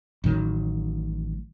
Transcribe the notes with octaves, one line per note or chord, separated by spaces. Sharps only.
A1 A2 D#3 F#3